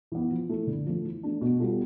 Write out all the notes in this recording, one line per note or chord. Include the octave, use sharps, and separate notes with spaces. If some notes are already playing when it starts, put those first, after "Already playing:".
E3 B3
F3
A3 E4 A4
D3
F3 A3
E3
A3 D4
B2
G3 B3 F4 A4